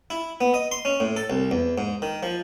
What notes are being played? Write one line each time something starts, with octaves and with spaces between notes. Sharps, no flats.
E4
B3
D#5
C6
C#4
A2
A4
C2
E2
G#2
D#3
F3